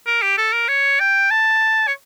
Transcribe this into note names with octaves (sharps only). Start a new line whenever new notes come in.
A#4
G4
A4
A#4
C#5
G5
A5
C#5